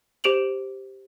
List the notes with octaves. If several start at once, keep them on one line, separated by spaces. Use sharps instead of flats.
G4 C5 D7 F7 F#7